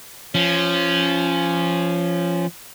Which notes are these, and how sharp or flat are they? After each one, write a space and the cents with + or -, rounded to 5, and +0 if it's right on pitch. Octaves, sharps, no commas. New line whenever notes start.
F3 -15 C#4 +0